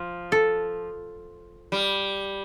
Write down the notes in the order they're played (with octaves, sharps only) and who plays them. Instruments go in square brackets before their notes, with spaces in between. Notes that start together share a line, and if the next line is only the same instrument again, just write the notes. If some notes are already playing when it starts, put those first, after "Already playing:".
Already playing: [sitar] F3
[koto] A4
[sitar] G3